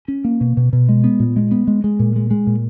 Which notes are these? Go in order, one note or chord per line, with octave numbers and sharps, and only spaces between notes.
C#4
A#3
B2
B2
B2
G#3
B3
A#2
G#3
B3
G#3
G#3
A#2
G#3
G#3
A#2